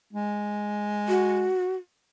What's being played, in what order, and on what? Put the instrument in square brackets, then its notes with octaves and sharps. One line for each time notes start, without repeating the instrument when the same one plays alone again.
[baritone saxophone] G#3
[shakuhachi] F#4